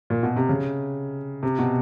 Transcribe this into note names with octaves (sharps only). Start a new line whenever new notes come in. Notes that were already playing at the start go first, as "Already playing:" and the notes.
A#2
B2
C3
C#3
C3
B2